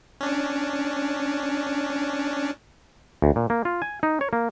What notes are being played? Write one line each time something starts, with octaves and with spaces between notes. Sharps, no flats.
C#4 D4
D2
A#2
A#3
F4
G#5
D#4
C#5
A#3